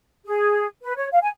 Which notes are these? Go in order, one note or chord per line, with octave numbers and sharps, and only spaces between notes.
G#4
B4
C#5
F5
G#5